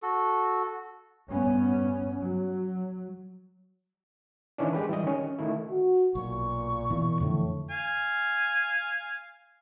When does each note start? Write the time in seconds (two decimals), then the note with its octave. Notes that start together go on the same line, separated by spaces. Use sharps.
0.02 F#4 A4
1.29 G2 B3 C#4
2.20 F#3
4.58 D#3 E3 C#4 D4
4.73 G#3 G4 B4
4.89 E3 G3 D#5
5.04 D#3 C#4
5.39 D#3 A3 E4
5.70 F#4
6.15 B1 A#2 C#6
6.90 B2 E3
7.20 F2 A2 D3 E3
7.71 F5 G#5